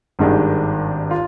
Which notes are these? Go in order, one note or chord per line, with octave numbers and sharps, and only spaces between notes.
G#1 G2 D#3 G#3 D4
F4